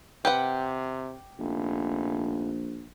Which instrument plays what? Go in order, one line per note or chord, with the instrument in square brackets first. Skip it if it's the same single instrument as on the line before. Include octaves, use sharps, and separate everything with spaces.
[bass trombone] C3 [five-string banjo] G4 B4 F#5
[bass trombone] F1 [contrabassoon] A#1